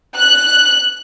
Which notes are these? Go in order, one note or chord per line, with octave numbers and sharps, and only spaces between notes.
F#6